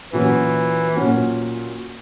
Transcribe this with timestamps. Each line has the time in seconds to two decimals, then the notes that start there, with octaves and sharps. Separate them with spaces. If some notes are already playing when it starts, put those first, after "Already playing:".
0.12 A#2 E3 F#3 C#4 F#4
0.96 A#2 F#3 C#4 F#4